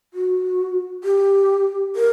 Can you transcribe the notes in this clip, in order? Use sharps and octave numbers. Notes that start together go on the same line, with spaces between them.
F#4
G4
A#4